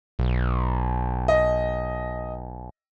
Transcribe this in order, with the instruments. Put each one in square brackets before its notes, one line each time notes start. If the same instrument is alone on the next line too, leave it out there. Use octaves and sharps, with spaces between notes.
[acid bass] B1
[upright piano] D#5